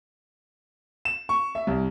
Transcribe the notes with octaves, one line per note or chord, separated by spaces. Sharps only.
E7
C#6
E5
C2